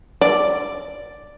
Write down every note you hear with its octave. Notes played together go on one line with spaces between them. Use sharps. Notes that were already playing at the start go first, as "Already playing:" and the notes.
D5